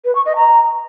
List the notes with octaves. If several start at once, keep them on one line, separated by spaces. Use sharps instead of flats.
B4
C#6
D#5
A#5